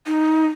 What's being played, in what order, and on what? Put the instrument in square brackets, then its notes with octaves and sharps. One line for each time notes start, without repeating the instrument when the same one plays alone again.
[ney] D#4